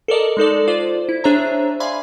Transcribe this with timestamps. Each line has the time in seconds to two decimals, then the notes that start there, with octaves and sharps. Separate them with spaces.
0.08 A4 A#4 D5 D#5
0.37 G#3 D#4 A4 D5
0.68 F4 C5 D5
1.09 E4
1.24 D4 G#4 C5 C#5 E5 A#5
1.80 D5 E5 F5 G#5 B5 C6